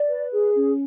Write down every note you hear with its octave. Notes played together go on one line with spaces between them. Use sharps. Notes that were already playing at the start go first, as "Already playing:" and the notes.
Already playing: D5
B4
G#4
C#4